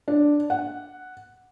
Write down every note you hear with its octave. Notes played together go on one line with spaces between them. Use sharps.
D4
F#5